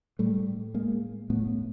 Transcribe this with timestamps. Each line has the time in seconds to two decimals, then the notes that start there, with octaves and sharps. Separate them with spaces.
0.19 A2 G3 A3
0.74 G#3 A#3
1.30 A2 A3 B3